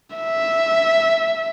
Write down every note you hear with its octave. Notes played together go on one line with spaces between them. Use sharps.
E5